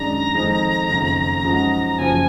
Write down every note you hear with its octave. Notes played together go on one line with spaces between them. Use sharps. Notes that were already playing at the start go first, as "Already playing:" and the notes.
Already playing: F#2 D#3 G#3 D4 A#5
F2 D#3 G#3 D#4
F#1 F2 D#3
F#2 F3 G#3 D#4 F#4
F#1 F#2 F3 G#5